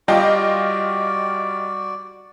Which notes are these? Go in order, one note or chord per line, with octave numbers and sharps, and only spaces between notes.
G3 F4 F#4 D5 D#5 G5